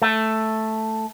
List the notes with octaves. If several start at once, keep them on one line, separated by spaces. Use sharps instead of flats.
A3